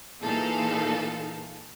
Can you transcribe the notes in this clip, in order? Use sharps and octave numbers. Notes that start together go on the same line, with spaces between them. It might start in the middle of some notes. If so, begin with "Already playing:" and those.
A#2 E3 D#4 G#4 A4 F5